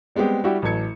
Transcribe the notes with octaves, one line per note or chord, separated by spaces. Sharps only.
G3 G#3 B3 C4 G4 G#4
G3 E4 F#4 G4
A1 F#3 A3 A4 G#6 C#7